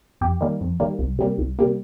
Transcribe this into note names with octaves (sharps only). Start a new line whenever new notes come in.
F2 G4
D#3 G3 A#3
F2
D#3 G3 A#3
C2
C3 G3 A#3
C2
C3 G3 A#3